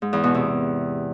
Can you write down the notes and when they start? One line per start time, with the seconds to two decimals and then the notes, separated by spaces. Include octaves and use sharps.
0.02 G#2
0.13 E2
0.24 B2
0.34 C3